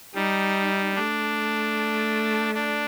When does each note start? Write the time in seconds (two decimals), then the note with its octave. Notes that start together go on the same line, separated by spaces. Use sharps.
0.15 G3 D#4
0.95 A3 D4
2.55 D4